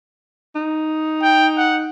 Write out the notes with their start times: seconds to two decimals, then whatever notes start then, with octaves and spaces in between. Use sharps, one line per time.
0.55 D#4
1.22 G5
1.57 F#5